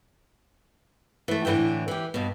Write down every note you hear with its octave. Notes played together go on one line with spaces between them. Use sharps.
E3 A3
A2 D3 E3 E5 G5
E3 G4
G2 B2